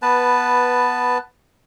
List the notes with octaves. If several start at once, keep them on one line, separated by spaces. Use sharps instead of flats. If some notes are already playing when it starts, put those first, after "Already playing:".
B3 B4 A5